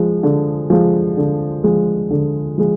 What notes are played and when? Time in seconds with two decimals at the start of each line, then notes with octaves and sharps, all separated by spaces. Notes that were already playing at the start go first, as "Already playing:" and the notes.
Already playing: F3 G#3
0.23 D3
0.70 F3 G#3
1.17 D3
1.64 F3 G#3
2.10 D3
2.58 F3 G#3